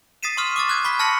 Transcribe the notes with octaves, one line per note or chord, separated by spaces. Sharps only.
D#6 A6 B6 C7 D#7 E7
C6 C#6 D#6 F6
D6 D#6 A6
F#6 G#6
B5 C#6 B6
A5 F6 A#6 C#7 F#7